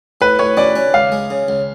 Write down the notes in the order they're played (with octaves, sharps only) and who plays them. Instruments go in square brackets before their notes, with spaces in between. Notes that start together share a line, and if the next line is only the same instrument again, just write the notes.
[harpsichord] A2 [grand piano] B4
[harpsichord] A2 [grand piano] C#5
[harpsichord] C#4 [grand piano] D5
[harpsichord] C#4
[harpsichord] C#2 [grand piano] F5
[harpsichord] G#3
C#3
C#2